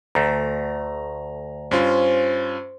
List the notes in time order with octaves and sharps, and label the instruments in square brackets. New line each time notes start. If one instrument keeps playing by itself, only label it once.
[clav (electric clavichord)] D2 A3 [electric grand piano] A#5
[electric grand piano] G2 C#4 F4 [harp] C5